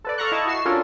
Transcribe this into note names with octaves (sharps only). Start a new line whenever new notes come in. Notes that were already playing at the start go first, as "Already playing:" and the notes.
A4 B4 D5
A4 F5 A#5 C#6 F#6
E4 D#5 A5 C#6
F#4 C#6 C7 E7
C#4 D4 F4 A4 A#4